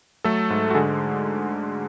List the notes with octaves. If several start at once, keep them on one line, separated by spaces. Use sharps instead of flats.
F#3 A3 A4
G#2
F#4
D3 G#3 G#4